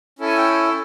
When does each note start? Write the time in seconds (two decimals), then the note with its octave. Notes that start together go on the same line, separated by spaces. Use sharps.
0.19 C#4 E4 A4
0.26 G#5
0.37 G5